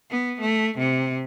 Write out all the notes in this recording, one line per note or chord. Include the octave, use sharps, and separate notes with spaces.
B3
A3
C3